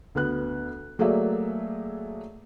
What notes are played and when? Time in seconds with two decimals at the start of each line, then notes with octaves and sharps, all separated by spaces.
0.15 D2 B3 F#6
0.99 F#3 A3 A#3 G#4 D5 E5